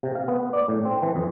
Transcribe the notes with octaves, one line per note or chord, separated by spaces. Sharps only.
C3
F5
B3
D5
A2
C4
E3
F2